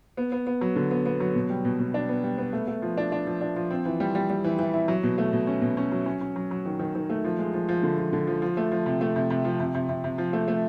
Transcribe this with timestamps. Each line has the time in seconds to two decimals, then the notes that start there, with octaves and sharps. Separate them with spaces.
0.17 B3
0.32 B3
0.47 B3
0.61 F#3
0.76 D3
0.91 B3
1.06 B3
1.20 F#3
1.35 B2
1.50 G3
1.65 B2
1.80 B2
1.94 D4
2.09 B3
2.24 G3
2.38 B3
2.53 A3
2.68 A3
2.82 F3
2.97 D4
3.12 D4
3.27 F3
3.41 D4
3.56 F3
3.71 C4
3.85 E3
4.00 G3
4.15 G3
4.30 G3
4.44 E3
4.59 E3
4.74 E4
4.88 F#3
5.03 B2
5.18 A3
5.33 B2
5.47 C#4
5.62 B2
5.77 C#4
5.92 F#3
6.06 C#4
6.21 C#4
6.36 F#3
6.51 F#3
6.66 D#3
6.80 D#3
6.95 D#3
7.10 A3
7.25 F3
7.39 G#3
7.54 F3
7.69 F3
7.83 D3
7.98 F3
8.13 D3
8.27 F3
8.42 F3
8.57 A3
8.72 F3
8.86 C3
9.01 A3
9.16 C3
9.30 C3
9.45 F3
9.60 C3
9.75 C3
9.89 C3
10.04 C3
10.18 F3
10.33 A3
10.48 A3